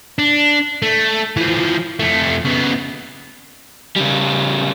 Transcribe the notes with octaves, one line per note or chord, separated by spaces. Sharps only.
D4
A3
E3 F3
F2 A3
C#3 B3
C#3 G3